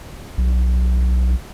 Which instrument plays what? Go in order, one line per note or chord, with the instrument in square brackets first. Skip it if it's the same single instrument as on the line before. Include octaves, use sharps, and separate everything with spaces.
[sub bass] B1